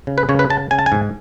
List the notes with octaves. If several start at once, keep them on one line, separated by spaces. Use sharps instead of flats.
C#3
B4
C#3 C#5
B4
C#3 A5
C#3 G#5
A5
G#5
G#2